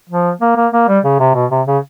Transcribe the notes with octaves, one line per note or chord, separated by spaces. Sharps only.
F3
A#3
A#3
A#3
G3
C#3
C3
B2
C3
C#3